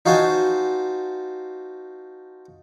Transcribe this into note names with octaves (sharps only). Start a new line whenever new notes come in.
D#4 F4 F#4 C5 G#5 A5